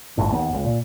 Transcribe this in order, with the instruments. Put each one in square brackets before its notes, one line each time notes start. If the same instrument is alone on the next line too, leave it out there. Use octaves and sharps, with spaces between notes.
[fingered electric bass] G1 A2
D#2 B3
C#2
A#2